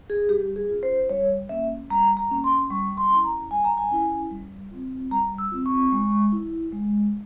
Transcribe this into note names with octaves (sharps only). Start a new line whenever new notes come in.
G#4
G3 G4
G#4
C#4 F4
C5
G3 C#5
A#3 C#4 E5
G3 A#5
A#5
A#3 C#4
C6
G3 C#6
C6
C#4 E4
A#5
G3 G#5
A#5
G#5
C#4 E4
G3
C4 F4
G3 A#5
E6
C4 F4
C#6
G#3
E4
G#3